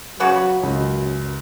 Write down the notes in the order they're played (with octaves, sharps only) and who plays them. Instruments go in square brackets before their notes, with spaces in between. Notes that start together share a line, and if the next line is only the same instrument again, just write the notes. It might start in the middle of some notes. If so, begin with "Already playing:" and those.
[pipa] C#3 F#4 B4 [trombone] F#3
[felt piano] C#2 [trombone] F#2